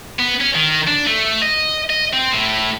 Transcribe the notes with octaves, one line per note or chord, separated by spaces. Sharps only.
B3
C#4
D#3
D4
A3
D#5
D#5
C4
A2